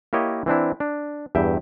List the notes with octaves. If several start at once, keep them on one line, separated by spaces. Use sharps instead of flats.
A#3 E4 G4 C#5 D#5
E3 C4 D4 E4
D4
E2 G2 E5 G5